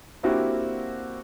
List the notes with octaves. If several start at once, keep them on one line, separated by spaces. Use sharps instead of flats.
A#3 C4 D4 E4 F#4 G4